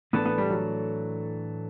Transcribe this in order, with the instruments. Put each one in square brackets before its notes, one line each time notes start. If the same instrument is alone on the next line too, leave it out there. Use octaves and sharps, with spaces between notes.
[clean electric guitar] A2 E3 A3 D4 A4 [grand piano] B3
[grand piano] B3
G3
F#3